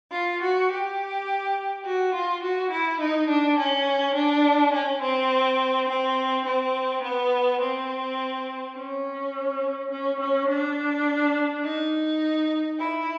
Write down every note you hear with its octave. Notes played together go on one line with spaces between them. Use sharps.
F4
F#4
G4
F#4
F4
F#4
E4
D#4
D4
C#4
D4
C#4
C4
C4
C4
B3
C4
C#4
C#4
C#4
D4
D#4
E4